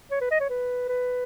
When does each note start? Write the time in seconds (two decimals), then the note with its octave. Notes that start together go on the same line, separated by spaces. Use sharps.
0.11 C#5
0.21 B4
0.31 D#5
0.40 C#5
0.50 B4
0.89 B4